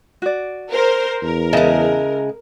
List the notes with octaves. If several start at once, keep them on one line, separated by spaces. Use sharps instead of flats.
F#4 D5
A#4 C5
E2 A#4
C#3 G#3 E4 D#5 A5